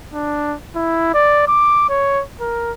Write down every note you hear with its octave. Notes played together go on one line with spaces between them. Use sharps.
D4
E4
D5
D6
C#5
A#4